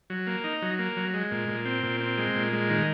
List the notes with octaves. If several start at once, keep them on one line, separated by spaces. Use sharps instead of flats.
F#3
A#3
D#4
F#3
A#3
F#3
G#3
A#2
A#2
C4
A#2
C4
G#3
A#2
G#3
D#3